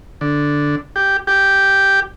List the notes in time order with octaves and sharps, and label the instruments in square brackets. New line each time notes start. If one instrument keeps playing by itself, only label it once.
[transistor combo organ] D3
G4
G4